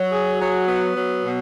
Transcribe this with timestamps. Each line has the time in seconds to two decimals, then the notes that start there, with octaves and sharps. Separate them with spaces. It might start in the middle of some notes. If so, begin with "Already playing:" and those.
Already playing: F#3
0.11 G#4
0.39 F#3
0.68 B3
0.95 F#3
1.23 B2